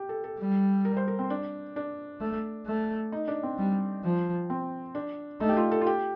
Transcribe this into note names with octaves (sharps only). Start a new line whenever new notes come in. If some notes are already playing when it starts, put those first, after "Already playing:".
Already playing: G4
A4
A4
G3
A#4
C5
A#4
C4
D4
D4
A3
A3
D#4
D4
C4
G3
F3
C4
D4
A3 D#4
G4
F4
A4
F4
G4